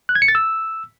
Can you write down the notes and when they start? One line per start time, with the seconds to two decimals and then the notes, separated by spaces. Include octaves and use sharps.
0.09 F#6
0.15 G#6
0.22 C#7
0.28 A6
0.35 E6